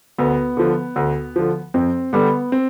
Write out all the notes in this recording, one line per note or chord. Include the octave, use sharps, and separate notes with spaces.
D2 B3
D3 F3
D2
D3 F3
F2 C4
D3 G3 B3
C4